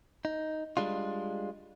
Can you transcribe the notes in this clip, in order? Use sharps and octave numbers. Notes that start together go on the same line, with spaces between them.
D#4
G3 G#3 D4 F4